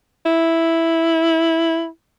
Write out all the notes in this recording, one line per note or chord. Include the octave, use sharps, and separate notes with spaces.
E4